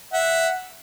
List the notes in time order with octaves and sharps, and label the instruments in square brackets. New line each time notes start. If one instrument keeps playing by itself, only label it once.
[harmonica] E5 F#5